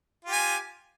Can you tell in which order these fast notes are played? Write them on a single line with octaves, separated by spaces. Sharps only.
F4 G4 G#5